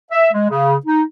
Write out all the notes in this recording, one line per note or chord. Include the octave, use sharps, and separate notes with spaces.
E5
G#3
C#3
D#4